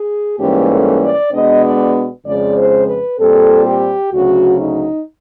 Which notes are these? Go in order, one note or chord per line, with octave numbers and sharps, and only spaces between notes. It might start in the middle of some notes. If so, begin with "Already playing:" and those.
Already playing: G#4
G#2 E3 G3 A#3 C#4 G4
A4
D5
B2 G#3 B3 D4 D#5
D5
F2 C#3 F3 G#3 D5
C5
B4
A#2 G3 C4 A4
G4
D2 C#3 F#3 F#4
D#4